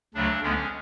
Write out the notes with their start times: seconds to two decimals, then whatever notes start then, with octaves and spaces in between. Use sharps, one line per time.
0.14 D2 C#3 F#3 A3 D4
0.42 D2 D3 G#3 B3 C#4